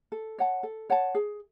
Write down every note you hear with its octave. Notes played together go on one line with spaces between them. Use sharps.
A4
C#5 F#5 A5
A4
C#5 F#5 A5
G#4